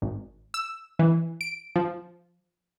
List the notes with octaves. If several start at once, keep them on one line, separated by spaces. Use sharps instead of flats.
G#1
E6
E3
D7
F3